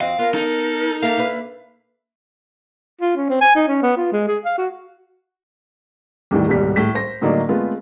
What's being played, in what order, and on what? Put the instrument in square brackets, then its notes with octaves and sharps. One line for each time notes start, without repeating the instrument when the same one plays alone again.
[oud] F2 F#4 D#5 [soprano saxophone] C4 [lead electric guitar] F5
[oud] B3 [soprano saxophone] F4 [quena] A#4
[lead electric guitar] D#4 [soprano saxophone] A4
[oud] A#3 A4 A#4 [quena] E5 [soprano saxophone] F5
[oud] A#3 D4 B4
[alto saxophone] F4
C#4
C4
G#5
D#4
C#4
B3
F4
G#3
G#4
F5
F#4
[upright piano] E2 A2 D#3 E3 G3
D#1 C2 G#2 B2 G3 B6
A2 B6
C5 A#6
A2 D3 F#3 A#3 D#4 D5
G#3 A3 B3 C4 F4